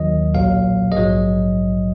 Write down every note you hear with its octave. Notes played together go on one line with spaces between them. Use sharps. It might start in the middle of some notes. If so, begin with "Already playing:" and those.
Already playing: D#2 D#3 F#3 D#5
B1 A#2 F#3 F5
A#1 G#2 F#3 D#5